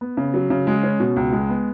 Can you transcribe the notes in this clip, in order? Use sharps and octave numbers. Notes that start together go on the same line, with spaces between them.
B3
C#3
F#3
C#3
G#3
C#4
B2
C#2
G#3
B3